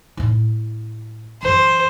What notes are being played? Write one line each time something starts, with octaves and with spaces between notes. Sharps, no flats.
A2 E4
F#2 E3 C5